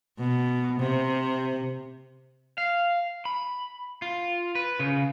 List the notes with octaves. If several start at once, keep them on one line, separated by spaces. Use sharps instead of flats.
B2
C3
F5
B5
F4
B4
C#3